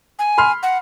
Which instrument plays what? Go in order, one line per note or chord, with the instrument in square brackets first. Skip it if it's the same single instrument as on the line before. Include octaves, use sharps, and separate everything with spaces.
[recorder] G#5
[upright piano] B5 C6 F6
[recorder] F#5